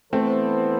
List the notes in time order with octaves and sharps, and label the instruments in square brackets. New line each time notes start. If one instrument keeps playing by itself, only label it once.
[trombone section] E3 B3 E4 A4 C5 [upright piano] A3 C4